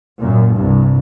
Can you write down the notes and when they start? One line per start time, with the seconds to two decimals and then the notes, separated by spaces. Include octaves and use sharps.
0.21 F#2 A#2
0.55 C2 G2